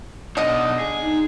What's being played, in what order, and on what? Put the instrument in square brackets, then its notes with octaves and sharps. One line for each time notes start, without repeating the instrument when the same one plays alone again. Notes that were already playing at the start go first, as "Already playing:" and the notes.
[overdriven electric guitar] B2 D#4 [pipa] D3 D#5
[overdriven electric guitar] G#4
[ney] D#4